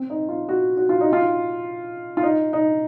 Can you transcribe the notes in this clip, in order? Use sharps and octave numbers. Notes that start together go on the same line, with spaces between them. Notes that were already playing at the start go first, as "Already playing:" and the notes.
Already playing: C4
D#4
F4
F#4
F#4
F4
D#4
F4
F4
D#4
D#4